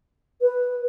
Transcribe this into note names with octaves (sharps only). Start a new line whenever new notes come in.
B4